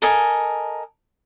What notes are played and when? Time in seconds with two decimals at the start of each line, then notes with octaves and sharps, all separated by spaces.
0.02 A4 A#4 D#5 G#5